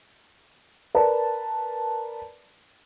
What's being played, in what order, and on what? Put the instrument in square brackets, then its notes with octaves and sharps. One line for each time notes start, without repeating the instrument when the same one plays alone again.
[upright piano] A#4 B4 D5 A5